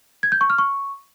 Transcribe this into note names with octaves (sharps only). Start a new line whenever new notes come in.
G#6
G6
C#6
F6
C#6